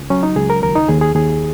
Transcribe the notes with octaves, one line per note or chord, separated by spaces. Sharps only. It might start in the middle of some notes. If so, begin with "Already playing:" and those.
Already playing: C#2
F#3 C#4
D#4
C#2 G#4
A#4
D#2 A#4
D#4
D#2 G#4
G#4
D#2 G#4